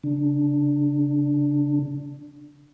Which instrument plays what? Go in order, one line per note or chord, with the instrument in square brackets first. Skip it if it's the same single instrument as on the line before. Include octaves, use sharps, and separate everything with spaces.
[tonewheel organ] C#3 D4